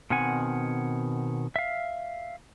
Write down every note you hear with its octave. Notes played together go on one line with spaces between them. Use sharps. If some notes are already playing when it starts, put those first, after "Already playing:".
B2 D#3 C4 F#5 G#5
E5 F5